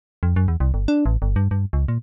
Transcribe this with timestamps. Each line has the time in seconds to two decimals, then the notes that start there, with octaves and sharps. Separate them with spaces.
0.23 F2
0.36 F#2
0.48 E2
0.60 C2
0.74 G1
0.88 D4
1.06 A1
1.22 G1
1.36 G2
1.51 G2
1.73 C#2
1.88 A#2